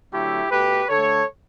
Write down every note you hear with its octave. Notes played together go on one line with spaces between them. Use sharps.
D3 F#3 A3 E4 G4
B2 A3 G4 B4
D3 A3 A4 C#5